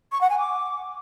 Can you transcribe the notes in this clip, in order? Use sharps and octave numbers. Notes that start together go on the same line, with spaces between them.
C#6
F#5
G#5
D6